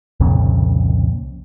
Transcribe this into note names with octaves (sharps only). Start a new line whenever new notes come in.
C2 F2 A#2 C#3